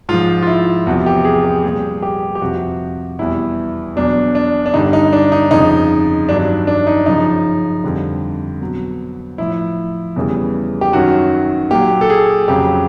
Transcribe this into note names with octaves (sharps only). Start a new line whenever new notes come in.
G#2 F3 F4
F4
E4
E2 C3 F3 F#4
G4
G#4
G4
A#2 G3 G#4
G4
G4
F2 C3 F3 F#4
E2 B2 G3 E4
E2 B2 F#3 D4
D4
D4
G2 D3 G3 D#4
D#4
D4
D#4
F2 C#3 F3 D#4
G2 D#3 F#3 D4
D4
D#4
F#2 C#3 F3 D#4
F2 D3 G3
B2 F#3
A2 F3 E4
E2 C#3 E3 G3
G4
F#2 D#3 F#3 F#4
A#2 F#3 G4
A4
G#4
F2 C#3 F#3 G4